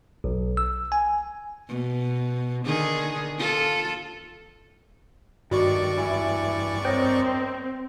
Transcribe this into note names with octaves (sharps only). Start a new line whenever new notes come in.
B1
E6
G#5
B2
D3 D#3 G#4
F4 A4
G2 D#3 F#4 D5 C#6
E3 E4
C4 A#4 C5 C#5 D#5 G5